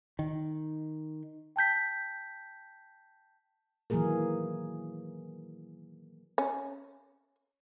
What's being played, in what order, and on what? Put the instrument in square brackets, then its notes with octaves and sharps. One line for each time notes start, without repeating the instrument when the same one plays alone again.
[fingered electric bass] D#3
[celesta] G5 A5 G6 B6
[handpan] D#3 E3 F#3 A#3 G#4 A#4
[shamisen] C#4